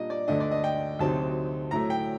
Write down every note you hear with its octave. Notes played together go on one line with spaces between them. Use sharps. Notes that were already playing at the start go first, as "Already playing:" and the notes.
Already playing: A#2 G3 D4 D#5
D5
D2 D3 A3 D4 D#5
D5
D#5
G5
D2 C3 F#3 C4 D#4 A5
A2 F#3 A3 A#5
G5